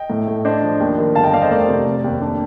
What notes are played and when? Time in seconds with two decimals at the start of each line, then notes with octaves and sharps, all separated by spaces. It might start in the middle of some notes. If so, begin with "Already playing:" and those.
Already playing: D#5 G5
0.10 A2
0.27 A3
0.45 D4 C5 D#5
0.62 F3
0.80 D#2
0.98 D#3
1.15 G1 F5 A5
1.24 D#5 G5
1.33 F2 D5 F5
1.42 C5 D#5
1.51 A3 A#4 D5
1.69 C3
1.86 F1
2.04 D#2
2.21 D4